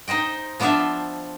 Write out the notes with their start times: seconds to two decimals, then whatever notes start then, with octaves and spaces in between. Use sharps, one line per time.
0.08 D#4 C5 D#5 G5
0.60 F3 B3 D4 C5 E5 F5